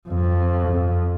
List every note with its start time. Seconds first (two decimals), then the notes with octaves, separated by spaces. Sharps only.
0.08 F2
0.68 F2